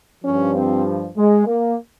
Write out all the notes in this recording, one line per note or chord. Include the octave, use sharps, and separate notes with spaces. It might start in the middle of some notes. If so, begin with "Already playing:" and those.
G2 F3 C#4
C4
G#3
A#3